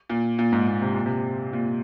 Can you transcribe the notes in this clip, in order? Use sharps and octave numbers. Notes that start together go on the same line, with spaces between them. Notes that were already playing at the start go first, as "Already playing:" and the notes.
A#2
A#2
G#2
A#2
C3
A#2
C3
A#2